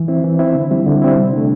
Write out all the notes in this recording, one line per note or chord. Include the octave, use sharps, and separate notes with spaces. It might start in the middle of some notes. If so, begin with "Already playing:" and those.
Already playing: E3
C4 E4
E3
C4 E4
D3
G3 C4 E4
D3
G3 C4 E4
C3
A3 D4